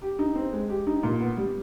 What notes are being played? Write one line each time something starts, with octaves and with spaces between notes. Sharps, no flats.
G4
D#4
C4
G#3
G4
D#4
A#2
B3
G3